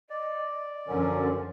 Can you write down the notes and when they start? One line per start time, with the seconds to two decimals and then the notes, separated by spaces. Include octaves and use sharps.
0.10 D5 D#5
0.87 F#2 D3 F3 F#3 C#4 A#4